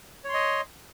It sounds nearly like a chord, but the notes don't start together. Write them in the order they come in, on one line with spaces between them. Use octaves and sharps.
C#5 C6 D#5